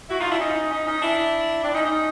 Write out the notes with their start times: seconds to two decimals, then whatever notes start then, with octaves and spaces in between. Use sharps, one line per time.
0.09 E4 F#4
0.20 D#4 F4
0.30 D4 E4
0.40 C#4 D#4
0.71 C#4 D#4
0.86 C#4 D#4
1.02 D4 E4
1.63 C4 D4
1.74 C#4 D#4
1.84 C#4 D#4